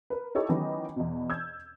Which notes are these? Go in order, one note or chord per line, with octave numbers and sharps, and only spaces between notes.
A#4 B4
D#4 E4 G4 A4 C#5
D#3 E3 F#3 B3 C#4 D#5
E2 B2
E6 G6 G#6